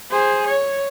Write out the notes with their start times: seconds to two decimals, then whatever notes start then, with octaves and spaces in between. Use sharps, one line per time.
0.10 G#4 C5
0.46 C#5